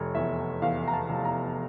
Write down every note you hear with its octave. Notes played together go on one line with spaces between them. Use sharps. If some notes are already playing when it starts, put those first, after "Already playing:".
Already playing: F1 C#5
E2 E5
E2 F5
A#5
A5
F1
A#5